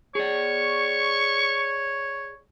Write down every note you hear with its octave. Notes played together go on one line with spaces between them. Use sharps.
G#4 C#5 D5 C#6